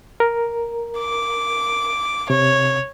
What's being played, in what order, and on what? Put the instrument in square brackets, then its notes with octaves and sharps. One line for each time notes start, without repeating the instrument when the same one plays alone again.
[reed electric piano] A#4
[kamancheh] D6
[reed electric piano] C3 [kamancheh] C#5